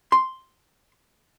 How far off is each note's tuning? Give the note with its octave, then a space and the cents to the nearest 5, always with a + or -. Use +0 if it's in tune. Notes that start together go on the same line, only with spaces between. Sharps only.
C6 +0